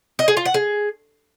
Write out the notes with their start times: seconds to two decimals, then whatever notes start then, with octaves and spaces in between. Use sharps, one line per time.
0.19 D#5
0.28 G#4
0.37 F4
0.45 F#5
0.54 G#4